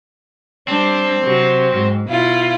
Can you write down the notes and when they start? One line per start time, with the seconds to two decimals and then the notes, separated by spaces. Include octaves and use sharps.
0.68 G3 C4 D4
1.23 C3 F#3
1.75 G#2
2.09 B2 E4 F4